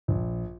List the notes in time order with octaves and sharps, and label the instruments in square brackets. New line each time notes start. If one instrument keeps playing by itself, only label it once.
[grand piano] A#1